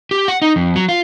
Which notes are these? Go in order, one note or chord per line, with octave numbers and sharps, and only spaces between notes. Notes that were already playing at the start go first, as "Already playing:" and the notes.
G4
F#5
D#4
F2
F#3
F4